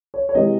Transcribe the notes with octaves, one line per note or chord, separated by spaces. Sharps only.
C#5
C#5
C3 E3 G#3 D#5